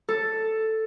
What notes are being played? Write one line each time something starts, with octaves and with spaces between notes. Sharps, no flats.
A4